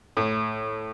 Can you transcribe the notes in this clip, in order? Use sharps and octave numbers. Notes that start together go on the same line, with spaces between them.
A2